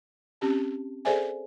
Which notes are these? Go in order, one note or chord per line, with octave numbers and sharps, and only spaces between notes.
C4 C#4 G4 A5
G#4 A4 C5 D5 E5 G#5